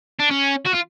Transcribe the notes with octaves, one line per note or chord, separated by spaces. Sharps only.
D4
C#4
F#4
F4